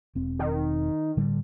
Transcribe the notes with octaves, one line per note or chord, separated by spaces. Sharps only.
E1 C4
D#3
A2 D3 G3